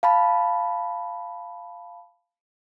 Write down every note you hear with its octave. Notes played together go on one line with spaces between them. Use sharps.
F5 A5 B5